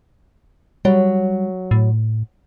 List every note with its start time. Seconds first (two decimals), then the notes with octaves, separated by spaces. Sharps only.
0.85 F#3 G3
1.71 A2